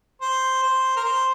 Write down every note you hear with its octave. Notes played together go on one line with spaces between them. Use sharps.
C5
C5
A#4
C5